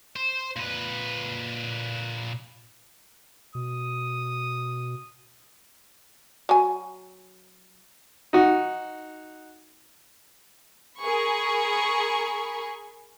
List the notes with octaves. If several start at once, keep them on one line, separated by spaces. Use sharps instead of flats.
C5
A#2 B4
B2 D#6
F#3 G#5
D#4 F#4
G#4 A#4 B5 C#6